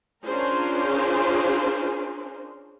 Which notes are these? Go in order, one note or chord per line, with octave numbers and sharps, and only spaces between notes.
C#4 D4 F4 G#4 A#4 C5